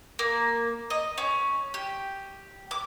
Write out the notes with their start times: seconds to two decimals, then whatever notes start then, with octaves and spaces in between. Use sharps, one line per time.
0.19 A#3
0.90 D#5
1.18 C#4
1.74 G4
2.71 D6